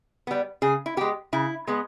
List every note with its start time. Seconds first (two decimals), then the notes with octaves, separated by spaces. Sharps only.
0.27 G3 B3
0.62 C#3 G#4
0.86 E4
0.97 G#3 B3 G4
1.33 C#3 E4
1.67 G#3 B3